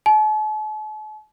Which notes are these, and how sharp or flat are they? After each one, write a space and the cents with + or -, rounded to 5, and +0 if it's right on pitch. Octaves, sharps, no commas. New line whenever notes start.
A5 -45